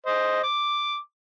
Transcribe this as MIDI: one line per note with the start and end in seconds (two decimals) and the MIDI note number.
0.06 0.42 72
0.06 0.42 75
0.43 0.97 86